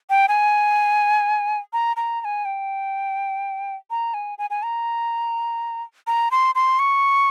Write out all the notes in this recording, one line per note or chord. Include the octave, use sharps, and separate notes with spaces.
G5
G#5
A#5
A#5
A#5
G#5
G5
A#5
G#5
G#5
G#5
A#5
A#5
C6
C6
C#6